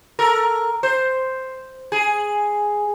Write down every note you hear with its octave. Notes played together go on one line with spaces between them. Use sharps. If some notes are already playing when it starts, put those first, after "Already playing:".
A4 A#4
C5
G#4